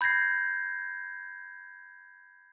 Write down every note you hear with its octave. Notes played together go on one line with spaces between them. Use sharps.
B5 G6 G#6 A#6 C7